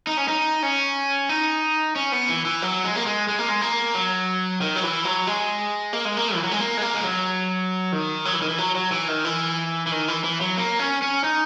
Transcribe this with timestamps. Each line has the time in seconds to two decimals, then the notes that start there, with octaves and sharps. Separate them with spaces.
0.07 D#4
0.17 C#4
0.28 D#4
0.63 C#4
1.29 D#4
1.96 C#4
2.12 B3
2.29 E3
2.45 E3
2.62 F#3
2.84 G#3
2.96 A#3
3.06 G#3
3.28 G#3
3.39 A#3
3.49 G#3
3.61 A#3
3.95 F#3
4.61 D#3
4.76 F#3
4.83 E3
5.05 F#3
5.27 G#3
5.93 A#3
6.05 G#3
6.17 A#3
6.35 E3
6.43 F#3
6.51 G#3
6.60 A#3
6.77 G#3
6.82 A#3
6.94 G#3
7.04 F#3
7.92 D#3
8.25 F#3
8.33 E3
8.41 D#3
8.49 E3
8.58 F#3
8.75 F#3
8.92 E3
9.08 D#3
9.25 E3
9.87 E3
9.91 D#3
10.08 E3
10.24 E3
10.41 F#3
10.57 A#3
10.79 C#4
11.02 C#4
11.24 D#4